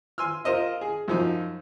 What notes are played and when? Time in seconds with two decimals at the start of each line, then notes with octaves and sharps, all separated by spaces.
0.18 G#5 C6 E6 F6
0.44 F4 A#4 C5 D#5 E5
0.81 G#4
1.08 F#2 F3 D#4